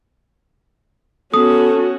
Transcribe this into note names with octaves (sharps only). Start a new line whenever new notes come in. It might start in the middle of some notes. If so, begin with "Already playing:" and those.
B3 C#4 F#4 A4 D#6